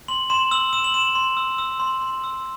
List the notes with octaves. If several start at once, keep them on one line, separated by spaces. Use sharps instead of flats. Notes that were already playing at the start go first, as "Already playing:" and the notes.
C6 F#7
C6 E7
E6 F#7
E6 E7
F#7
C6 E7
C6
E6
E6
C6
C6
E6